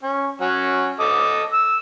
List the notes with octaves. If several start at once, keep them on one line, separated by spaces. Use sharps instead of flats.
C#4
F#3 C#4
A4 D#5 D6
E6